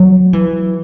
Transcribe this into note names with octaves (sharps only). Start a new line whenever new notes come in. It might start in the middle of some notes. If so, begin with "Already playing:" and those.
Already playing: F#3
E3